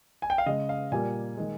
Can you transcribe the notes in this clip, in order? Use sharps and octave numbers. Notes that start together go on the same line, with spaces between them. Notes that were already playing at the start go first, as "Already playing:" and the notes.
G#5
G5
F5
C#3 G#3 D#5
F5
A#2 G3 A#3 G#5
D#3 G#3